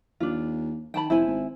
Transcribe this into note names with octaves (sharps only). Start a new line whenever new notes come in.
D#2 D4 F4
D#3 G5 A5 B5
F1 E4 C5 G#5
G#1